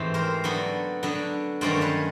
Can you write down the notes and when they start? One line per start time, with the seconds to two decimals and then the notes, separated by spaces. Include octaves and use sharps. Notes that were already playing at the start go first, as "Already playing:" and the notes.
Already playing: G#2 E3 A3 C4 G4
0.14 A#4 C5
0.44 D3 F#3 B3 D4
1.03 D3 F#3 B3 D4
1.61 G2 D#3 F#3 A3 C#4 C5 D5
1.81 B4 C#5